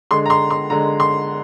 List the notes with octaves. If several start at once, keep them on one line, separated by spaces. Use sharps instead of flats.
D3 G#3 C6
A#5
C6
C6
D3 G#3 A#5
C6